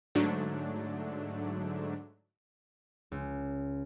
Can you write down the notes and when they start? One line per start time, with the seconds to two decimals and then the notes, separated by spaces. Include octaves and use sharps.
0.15 G#2 D3 F#3 A3 D4
3.12 C#2